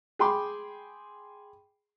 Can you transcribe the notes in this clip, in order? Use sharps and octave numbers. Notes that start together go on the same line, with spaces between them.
G#4 G5 B5 C6 D6